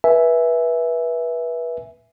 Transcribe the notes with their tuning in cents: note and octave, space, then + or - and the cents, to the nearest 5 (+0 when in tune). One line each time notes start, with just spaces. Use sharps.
B4 -25 E5 +0 G#5 +0